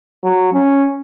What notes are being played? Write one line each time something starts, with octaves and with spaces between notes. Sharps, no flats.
F#3
C#4